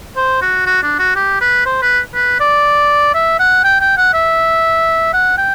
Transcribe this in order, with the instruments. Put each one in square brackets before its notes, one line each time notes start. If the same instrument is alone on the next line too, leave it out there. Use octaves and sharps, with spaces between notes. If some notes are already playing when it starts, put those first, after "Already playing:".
[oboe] C5
F#4
F#4
D4
F#4
G4
B4
C5
B4
B4
D5
E5
F#5
G5
G5
F#5
E5
F#5
G5